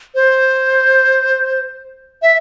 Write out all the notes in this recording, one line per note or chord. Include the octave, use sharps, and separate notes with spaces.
C5
E5